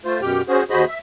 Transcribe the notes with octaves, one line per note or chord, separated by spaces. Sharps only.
A3 F4 C5
F#2 B2 G4 G5 F6
C#4 F#4 G#4 C5
D#2 F#4 G#4 C5 D#5 B5
E5